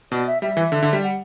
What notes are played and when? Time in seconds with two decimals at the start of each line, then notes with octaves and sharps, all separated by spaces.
0.12 B2 D5
0.27 E5
0.42 G3 E5
0.57 E3
0.72 D3
0.83 D3
0.93 G3
1.03 F#5